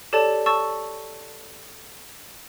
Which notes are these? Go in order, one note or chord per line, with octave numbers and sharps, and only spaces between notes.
G4 A4 C#5 D5 A5
A5 C#6 E6 A6